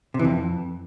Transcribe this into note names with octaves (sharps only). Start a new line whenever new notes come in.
C3
E3
F2